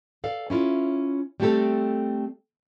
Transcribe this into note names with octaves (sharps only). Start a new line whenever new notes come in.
A4 D5 F5
C#4 E4 F4
G3 A3 C4 G4 A4